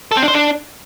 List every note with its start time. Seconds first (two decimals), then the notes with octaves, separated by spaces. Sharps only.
0.11 A4
0.17 C4
0.22 D4
0.28 C5
0.33 D4